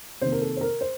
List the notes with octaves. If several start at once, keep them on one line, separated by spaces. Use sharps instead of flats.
C3 D#3 A#3 C5
A#4
A4
C5
A#4
C5